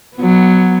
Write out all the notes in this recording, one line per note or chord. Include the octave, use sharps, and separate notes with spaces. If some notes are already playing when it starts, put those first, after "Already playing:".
F#3 B3